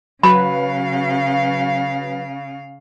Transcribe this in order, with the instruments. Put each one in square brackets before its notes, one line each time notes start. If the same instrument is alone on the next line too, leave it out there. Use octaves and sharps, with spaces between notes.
[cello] C#3 F5 [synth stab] F#3 F#4 B4 [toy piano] B5